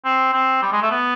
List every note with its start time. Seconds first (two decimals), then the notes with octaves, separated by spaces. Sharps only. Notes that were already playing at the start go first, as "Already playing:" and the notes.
0.05 C4
0.33 C4
0.62 G3
0.72 G#3
0.82 A3
0.91 B3